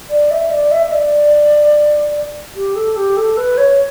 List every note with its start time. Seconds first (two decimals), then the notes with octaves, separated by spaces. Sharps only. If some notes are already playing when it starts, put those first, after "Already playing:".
0.10 D5
0.31 E5
0.51 D5
0.71 E5
0.87 E5
0.92 D5
2.55 G4
2.75 A4
2.96 G4
3.17 A4
3.37 B4
3.57 C#5